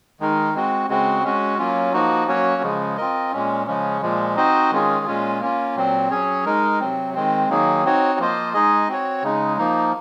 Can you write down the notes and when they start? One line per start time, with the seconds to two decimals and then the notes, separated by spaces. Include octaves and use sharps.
0.20 D#3 G#3 D#4 A#4
0.54 G#3 C4 F#4
0.89 C#3 G#3 C4 F#4
1.23 G#3 C#4 F#4
1.58 F#3 A#3 C#4 F4
1.93 F3 A#3 D#4 F#4
2.28 F#3 A#3 C#4 F#4 C#5
2.62 C#3 F3 G#3
2.97 C4 F4 A#4 D#5
3.33 A#2 G#3 C#4
3.67 C#3 F3 G#3 C#4
4.02 A#2 F3 G#3
4.36 C4 D#4 F#4 C5 D#5
4.71 D#3 G#3 C#4 F4 G#4
5.06 A#2 G#3 C#4 F4
5.40 A#3 C#4 F4
5.76 A#2 F#3 C4
6.10 F#3 C#4 G#4 C#5
6.46 G#3 D#4 A#4
6.80 C3 F#3 C4
7.14 D#3 G#3 C4
7.49 D#3 F#3 A#3 D#4 G#4
7.85 C4 D#4 F#4 C#5
8.19 F3 A#3 F4 C5 D#5
8.54 G#3 D#4 G#4 D#5
8.88 C4 F#4 C#5
9.22 C#3 G#3 D#4
9.57 F3 A#3 D#4